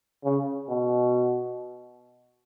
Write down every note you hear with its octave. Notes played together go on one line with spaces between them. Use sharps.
C#3
B2